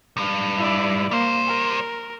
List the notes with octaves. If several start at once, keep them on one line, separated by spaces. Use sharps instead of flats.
C2 G2
E4 D5
G3 A#3 C5
A#4